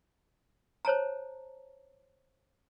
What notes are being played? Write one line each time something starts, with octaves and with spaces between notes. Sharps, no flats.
C5 C#5 A5 A#5